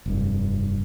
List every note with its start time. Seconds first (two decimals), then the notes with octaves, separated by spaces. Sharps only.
0.06 F1 G2